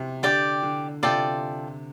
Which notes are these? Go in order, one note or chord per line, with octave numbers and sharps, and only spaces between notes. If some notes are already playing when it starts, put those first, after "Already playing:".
Already playing: C3
D3 G4 D5 G5
D3
C3 F4 A4 D5 G5